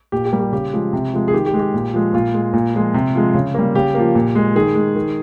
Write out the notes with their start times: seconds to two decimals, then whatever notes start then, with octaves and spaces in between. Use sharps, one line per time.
0.12 A#2 G4
0.25 G4
0.33 G3 A#3
0.39 G4
0.52 C#3 G4
0.73 F3 G#3
0.93 C3
1.13 F3 G#3
1.28 G#4
1.33 D#3 G4
1.46 G4
1.53 G#3
1.59 G4
1.74 A#2
1.93 F3 G#3
2.13 A#2 F4
2.34 G#3
2.53 A#2
2.74 F3 G#3
2.94 C3
3.15 F3 G#3
3.34 C#3
3.54 G3 A#3
3.75 C#3 G4
3.95 F3 A#3
4.15 A#2
4.35 G#3
4.55 D#3 G#4
4.75 G#3
4.96 D#3